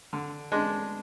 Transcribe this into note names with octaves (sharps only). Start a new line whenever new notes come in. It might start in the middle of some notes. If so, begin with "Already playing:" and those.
D3
G#3 D4